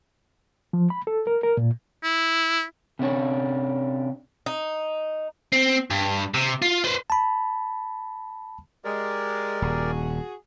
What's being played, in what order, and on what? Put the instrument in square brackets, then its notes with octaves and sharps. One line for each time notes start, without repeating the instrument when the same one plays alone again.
[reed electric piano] F3
B5
A4
A#4
A#4
A#2
[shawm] E4
[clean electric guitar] C3 C#4 D4 C#5
[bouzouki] D#4
[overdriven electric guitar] C4
G2
C3
F4
B4 C5
[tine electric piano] A5 B5
[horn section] G#3 [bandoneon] G4 A#4 D5
[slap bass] D#1 [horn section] F#4 G#4